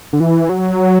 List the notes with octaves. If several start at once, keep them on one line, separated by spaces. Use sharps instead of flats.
D3
E3
F#3